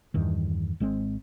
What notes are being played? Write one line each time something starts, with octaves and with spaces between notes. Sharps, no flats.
E2 G2 D#3
G#1 G#3 C4